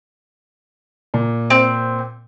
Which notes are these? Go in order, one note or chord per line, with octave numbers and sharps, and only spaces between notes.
A#2
C4